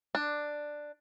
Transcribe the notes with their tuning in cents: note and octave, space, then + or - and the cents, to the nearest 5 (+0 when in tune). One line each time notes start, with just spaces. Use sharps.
D4 +10